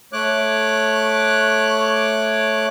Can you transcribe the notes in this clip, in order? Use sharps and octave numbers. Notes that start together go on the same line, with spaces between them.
A3 C#5 D6 F#6